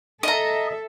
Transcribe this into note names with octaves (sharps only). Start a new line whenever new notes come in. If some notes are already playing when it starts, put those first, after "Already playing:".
A4 D#5 E5 A#5